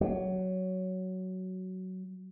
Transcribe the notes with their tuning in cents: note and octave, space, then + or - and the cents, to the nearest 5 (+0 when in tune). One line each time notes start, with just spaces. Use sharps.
F#3 +10